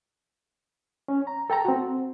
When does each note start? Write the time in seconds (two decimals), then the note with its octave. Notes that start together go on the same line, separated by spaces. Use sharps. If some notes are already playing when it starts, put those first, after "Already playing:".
1.08 C#4
1.27 A#5
1.50 A4 G5 A5 A#5
1.65 C4 F#4